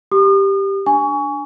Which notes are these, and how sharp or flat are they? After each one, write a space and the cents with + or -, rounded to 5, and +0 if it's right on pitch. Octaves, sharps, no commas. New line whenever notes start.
G4 +0 D#6 -45
D4 +0 G#5 +0 C#6 +25